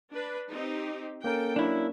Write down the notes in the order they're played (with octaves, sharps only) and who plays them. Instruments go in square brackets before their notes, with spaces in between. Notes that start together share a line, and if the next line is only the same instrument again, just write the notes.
[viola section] D4 B4
C4 D#4 G4
[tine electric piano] A#3 C#4 A#4 [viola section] A4 G5
[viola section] F#3 [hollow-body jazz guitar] D4 E4